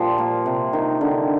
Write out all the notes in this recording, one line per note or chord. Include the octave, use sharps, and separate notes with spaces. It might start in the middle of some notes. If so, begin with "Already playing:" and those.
Already playing: A#2 F3 G3 C6
A#3
C3
D#3
D3